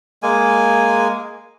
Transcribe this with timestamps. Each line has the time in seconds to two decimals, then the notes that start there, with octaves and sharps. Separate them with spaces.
0.23 G#3 A#3 G#5